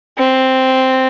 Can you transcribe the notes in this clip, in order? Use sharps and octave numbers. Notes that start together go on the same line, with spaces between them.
C4